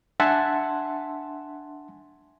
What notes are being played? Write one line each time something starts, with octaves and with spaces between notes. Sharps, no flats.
D4 E5 F#5 G#5 A5 C6